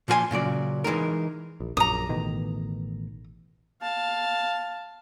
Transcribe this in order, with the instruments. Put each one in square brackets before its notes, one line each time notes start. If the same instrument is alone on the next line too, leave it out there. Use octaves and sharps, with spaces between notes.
[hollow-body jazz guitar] A#2 F3 F4 F#4 G#5 C6
A#2 C#3 F#3 D5
E3 G#3 D#4 A#4
[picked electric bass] A#1
[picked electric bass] A#1 F#2 [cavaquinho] A#5 D#6
[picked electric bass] A1 B2 D#3
[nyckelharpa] F5 A5